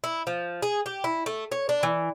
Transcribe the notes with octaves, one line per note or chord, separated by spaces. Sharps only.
E4
F3
G#4
G4
E4
A3
C#5
D4
E3